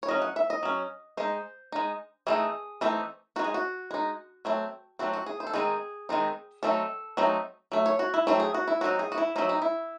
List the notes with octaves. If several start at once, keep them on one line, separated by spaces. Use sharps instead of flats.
C#5
F#3 C#4 D#5
F#5
E5
D#5
F#3 C#4
G#3 D#4 C5
G#3 D#4
E3 A3 C4 D#4 G#4
E3 A3 C4 D#4
G#3 D#4 F#4
G#4
F#4
G#3 D#4
F#3 A3 C4
F#3 A3 C4 F#4
F#4
G#4
C5
A4
D#3 G#3 C4 D#4 G#4
D#3 G#3 C4 D#4
F#3 A3 C4 D#4 A4
F#3 A3 C4 D#4
F#3 A3
C#5
F#4
E4
F#3 A3 C4 E4
G#4
F#4
E4
F#3 C4 D#4 F#4
G#4
F#4
E4
F#3 C4 D#4 E4
D#4
E4